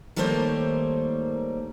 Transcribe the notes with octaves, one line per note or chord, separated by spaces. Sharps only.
D#3 G3 A3 A#3 C5 C#5